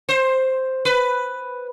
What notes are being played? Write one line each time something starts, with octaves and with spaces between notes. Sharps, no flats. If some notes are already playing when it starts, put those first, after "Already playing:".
C5
B4